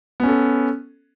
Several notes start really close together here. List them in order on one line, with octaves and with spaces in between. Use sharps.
B3 C#4 A4